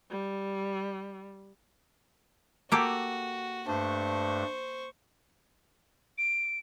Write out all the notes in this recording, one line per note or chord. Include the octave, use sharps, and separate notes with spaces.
G3
A#3 F#4 G4 A4
G2 A3 D4 C5 C#6
D7